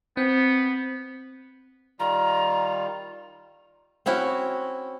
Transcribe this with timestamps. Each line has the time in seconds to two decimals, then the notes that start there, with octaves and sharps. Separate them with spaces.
0.17 B3 C4
2.00 D#3 G3 F4 A#5
4.06 C4 C#4 E4 F#4